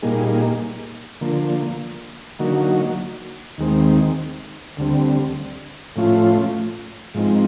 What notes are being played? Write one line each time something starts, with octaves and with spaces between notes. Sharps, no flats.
A#2 G3 A#3 D#4 G#4
D3 F3 A#3
D3 F#3 A#3 D#4 F#4
D#2 D#3 G#3 C4
D2 D3 G3 C4
A2 F3 A3 C#4 F4
G#2 F3 G#3 C4 D#4